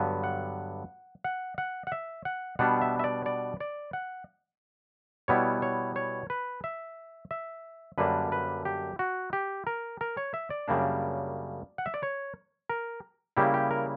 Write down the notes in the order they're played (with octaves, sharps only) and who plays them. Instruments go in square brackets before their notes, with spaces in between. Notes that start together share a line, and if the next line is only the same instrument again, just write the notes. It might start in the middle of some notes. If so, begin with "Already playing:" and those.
Already playing: [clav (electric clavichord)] G2 D3 F#3 B3
F#5
F#5
F#5
F#5
E5
F#5
B2 G3 B3 D4 F#5
E5
E5
D5
D5
D5
F#5
B2 G3 B3 E4 C#5
C#5
C#5
B4
E5
E5
F#2 D3 G3 A#3 D4 B4
B4
G4
F#4
G4
A#4
A#4
C#5
E5
D5
F#2 C#3 G3 A#3 D4
F#5
E5
D5
C#5
A#4
C#3 G3 A#3 E4 G4
G4
A#4